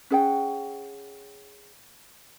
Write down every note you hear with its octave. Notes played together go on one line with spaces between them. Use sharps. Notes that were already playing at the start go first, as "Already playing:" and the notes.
C#4 G#4 F#5 G5